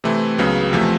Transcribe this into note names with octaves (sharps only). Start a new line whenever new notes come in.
C3 E3 A3 C4 E4
C#2 C#3 F#3 B3
E2 C3 F3 A3